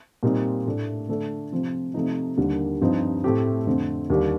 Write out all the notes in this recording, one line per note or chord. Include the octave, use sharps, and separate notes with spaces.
A#2 G3 C4 D#4
A2 A3 D4
D3 A3 D4 A4
C3 F3 C4
C3 F3 A3 D#4
D#2 D3 G3 A#3
G2 F3 C4 D#4
A2 A3 C4 G4
F2 D3 A3 C4
D#2 D3 G3 D4 G4